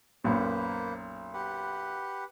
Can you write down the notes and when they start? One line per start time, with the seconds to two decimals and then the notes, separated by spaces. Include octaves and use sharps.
0.24 B1 F#2 A#2 A#3 B4 C5
1.34 G4 B4 F#5